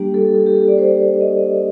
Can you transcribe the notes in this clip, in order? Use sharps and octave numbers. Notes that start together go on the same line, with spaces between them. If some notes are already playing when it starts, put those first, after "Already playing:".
Already playing: G3 A#3 D4 G4
A4
A4
G4
A4
D5
C5
D#5